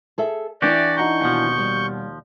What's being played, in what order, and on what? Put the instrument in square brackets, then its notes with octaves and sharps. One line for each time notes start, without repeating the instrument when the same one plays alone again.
[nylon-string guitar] G#4 A4 E5
[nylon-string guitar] E3 D4 E4 [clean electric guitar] F#4 G4 [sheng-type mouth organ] D5
[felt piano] D#4 F#5 A#5 [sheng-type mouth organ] C#6 G6
[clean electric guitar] D#2 F3 [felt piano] B2 F#5
[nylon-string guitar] G3